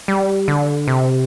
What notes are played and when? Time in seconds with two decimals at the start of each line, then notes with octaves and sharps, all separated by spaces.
0.08 G3
0.48 D3
0.88 C3